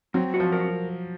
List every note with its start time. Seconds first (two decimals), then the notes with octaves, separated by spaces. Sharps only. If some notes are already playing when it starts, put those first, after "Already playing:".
0.14 F#3 C4
0.34 F#4
0.40 F3
0.52 A#4